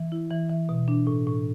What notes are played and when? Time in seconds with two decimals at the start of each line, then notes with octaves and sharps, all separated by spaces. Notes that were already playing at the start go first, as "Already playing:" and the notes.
Already playing: E3
0.12 E4
0.31 E3
0.49 E3
0.69 B2
0.88 D4
1.07 A2
1.27 A2